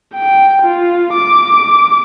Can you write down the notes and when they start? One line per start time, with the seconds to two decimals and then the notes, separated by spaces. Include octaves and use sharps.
0.15 G5
0.63 F4
1.14 D6